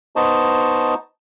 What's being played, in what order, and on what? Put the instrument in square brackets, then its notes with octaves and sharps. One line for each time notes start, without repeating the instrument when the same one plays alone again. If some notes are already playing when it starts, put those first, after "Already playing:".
[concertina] B3 D#4 C5 D#5 A5 C#6